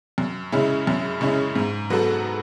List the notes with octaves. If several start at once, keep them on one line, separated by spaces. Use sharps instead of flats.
F#2
C#3 G#3 C#4 E4
F#2
C#3 G#3 C#4 E4
G#2
F#3 B3 F#4 A4